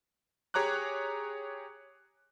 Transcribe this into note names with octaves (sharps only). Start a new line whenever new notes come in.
G4 G#4 C#5 A#5 D6 F#6